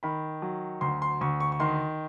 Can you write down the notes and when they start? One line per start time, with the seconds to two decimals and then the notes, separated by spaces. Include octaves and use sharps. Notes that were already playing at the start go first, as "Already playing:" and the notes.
0.03 D#3 B5
0.42 F#3
0.81 D2 C6
1.02 C6
1.21 D2 C#6
1.40 C#6
1.52 C#6
1.60 D#3 C6